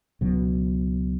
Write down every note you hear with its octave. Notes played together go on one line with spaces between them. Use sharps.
C#2 B2 F#3